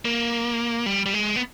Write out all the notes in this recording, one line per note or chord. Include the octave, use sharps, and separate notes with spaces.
A#3
G3
G3
G#3
B3